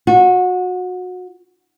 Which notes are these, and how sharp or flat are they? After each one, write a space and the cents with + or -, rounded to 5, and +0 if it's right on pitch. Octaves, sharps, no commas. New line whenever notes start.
F#4 -25